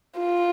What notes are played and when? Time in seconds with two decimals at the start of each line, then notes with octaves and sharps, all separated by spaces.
0.19 F4